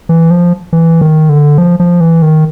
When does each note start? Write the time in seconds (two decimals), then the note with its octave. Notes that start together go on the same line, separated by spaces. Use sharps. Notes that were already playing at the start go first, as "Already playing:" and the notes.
0.09 E3
0.30 F3
0.73 E3
1.01 D#3
1.29 D3
1.58 F3
1.80 F3
2.00 E3
2.22 D#3